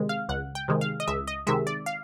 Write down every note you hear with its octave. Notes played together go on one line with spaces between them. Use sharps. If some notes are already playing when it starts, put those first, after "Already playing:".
Already playing: C3 D#3 G#3
F5
C#2 F#5
G5
C3 D#3 G#3
F5
D#5
C#2 E5
D#5
C3 D#3 G#3 E5
D5
F5